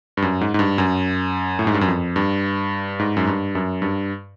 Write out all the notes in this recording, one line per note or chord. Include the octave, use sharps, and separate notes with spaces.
G2
F#2
G#2
G#2
G2
F#2
A2
G#2
G2
F#2
F2
G2
G#2
F#2
G2
F#2
G2